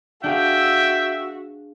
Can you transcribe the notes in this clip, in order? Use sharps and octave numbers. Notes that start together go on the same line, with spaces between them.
D4 F#4 G#4 E5 F5 G5